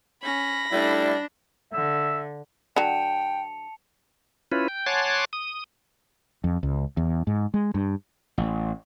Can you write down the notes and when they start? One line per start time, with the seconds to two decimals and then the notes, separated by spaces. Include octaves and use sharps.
0.22 C#4 B5 A#6
0.72 G3 A3 D4 E4
1.73 D3 E5
2.76 D3 F#3 G5 A5 C#7 F7
4.52 C#4 E4 F4 B4
4.68 G5
4.86 C#5 F#5 G#5 A5 C6 D6
5.33 D#6
6.44 F2
6.63 C#2
6.97 E2
7.27 G#2
7.54 G#3
7.74 G2
8.38 A1